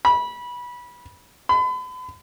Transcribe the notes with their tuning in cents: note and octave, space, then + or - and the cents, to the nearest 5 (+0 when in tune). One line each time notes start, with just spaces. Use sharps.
B5 -20
B5 +40